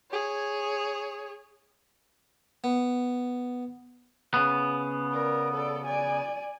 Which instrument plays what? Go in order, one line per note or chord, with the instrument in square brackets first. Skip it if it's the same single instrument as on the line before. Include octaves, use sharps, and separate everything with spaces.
[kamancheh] G#4 C#5
[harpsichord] B3
[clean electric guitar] C#3 B3
[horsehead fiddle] A#4 D5
A4 D5
D5 G#5